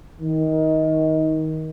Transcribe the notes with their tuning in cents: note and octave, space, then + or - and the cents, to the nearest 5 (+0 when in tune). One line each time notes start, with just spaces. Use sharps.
D#3 +20